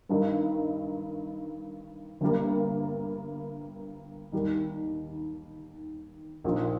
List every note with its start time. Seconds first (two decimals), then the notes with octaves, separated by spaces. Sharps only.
0.09 G2 D#3 G3 D#4 A#4
2.21 G1 G2 G3 A#3
4.32 D#2 D#3 G3 D#4
6.44 A#1 A#2 F3 D#4